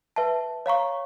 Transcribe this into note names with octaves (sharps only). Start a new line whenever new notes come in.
B4 E5 A5
C#5 F5 A#5 C#6